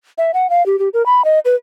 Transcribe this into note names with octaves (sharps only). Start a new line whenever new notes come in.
E5
F#5
F5
G4
G4
A#4
B5
D#5
B4